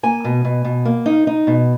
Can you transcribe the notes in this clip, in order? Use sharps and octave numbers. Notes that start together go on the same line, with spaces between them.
A#3 G#5
B2
B2
B2
A#3
D#4
D#4
B2